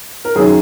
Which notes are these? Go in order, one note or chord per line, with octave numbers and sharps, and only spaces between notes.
A#4
F#2 D#3 F#3 G#4